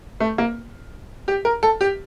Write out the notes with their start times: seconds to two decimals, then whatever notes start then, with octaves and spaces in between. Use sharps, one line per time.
0.20 A3
0.38 A#3
1.28 G4
1.45 A#4
1.63 A4
1.81 G4